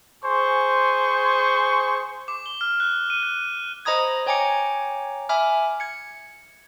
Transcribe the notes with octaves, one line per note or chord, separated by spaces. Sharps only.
G#4 C5 G#5 C#6
D6
G7
F6
F#6
D#7
F#6
C5 D#5 A#5 B5 D#6 G#6
C#5 G5 G#5 A#5 D6 C#7
E5 G#5 B5 D6 F6
G#6 C#7